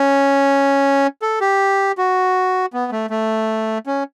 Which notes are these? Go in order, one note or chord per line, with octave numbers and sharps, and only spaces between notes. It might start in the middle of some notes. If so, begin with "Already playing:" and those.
Already playing: C#4
A4
G4
F#4
B3
A3
A3
C#4